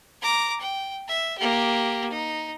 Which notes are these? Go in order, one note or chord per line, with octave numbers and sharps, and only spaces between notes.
A#5 D6
G5
E5
A#3 G4
D#4